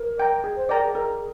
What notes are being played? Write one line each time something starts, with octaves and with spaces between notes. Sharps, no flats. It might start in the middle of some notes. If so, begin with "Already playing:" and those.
Already playing: A#4
D5 G5 A#5
G#4
C5
A#4 D5 G5 A#5
G#4
A#4